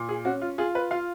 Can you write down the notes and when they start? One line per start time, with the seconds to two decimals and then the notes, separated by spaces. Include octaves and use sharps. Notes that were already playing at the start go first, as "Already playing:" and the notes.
Already playing: A#2
0.09 G#4
0.25 C#4 F#4
0.42 F4
0.58 F4 G#4
0.75 B4
0.91 F4 F5